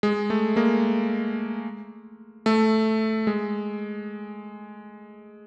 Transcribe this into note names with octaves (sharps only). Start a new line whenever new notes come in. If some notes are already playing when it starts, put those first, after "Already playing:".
G#3
A3
G#3 A#3
A3
G#3